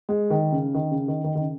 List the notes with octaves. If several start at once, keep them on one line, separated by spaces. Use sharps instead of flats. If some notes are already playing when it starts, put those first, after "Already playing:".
G#3
D#3
C#3
D#3
C#3
D#3
D#3
D#3
C#3